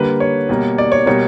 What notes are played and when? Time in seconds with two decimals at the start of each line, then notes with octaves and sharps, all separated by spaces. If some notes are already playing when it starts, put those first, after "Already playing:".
Already playing: D3 G3 A#3 B4
0.20 C#5
0.49 B2 G3 A#3
0.78 D5
0.92 C#5
1.06 B2 G3 A#3 C#5